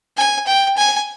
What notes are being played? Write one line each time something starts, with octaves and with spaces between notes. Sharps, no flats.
G#5
G5
G#5